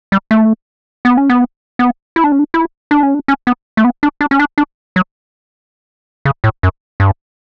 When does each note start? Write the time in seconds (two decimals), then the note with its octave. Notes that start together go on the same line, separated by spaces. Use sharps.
0.12 G3
0.31 A3
1.05 B3
1.17 C#4
1.30 B3
1.79 B3
2.16 E4
2.24 D4
2.32 C#4
2.39 D4
2.54 E4
2.91 D4
3.03 C#4
3.14 D4
3.28 C#4
3.47 B3
3.77 A3
3.84 B3
4.03 D4
4.21 D4
4.31 C#4
4.40 D4
4.58 D4
4.96 F#3
6.25 C#3
6.44 A2
6.63 F#2
7.00 G2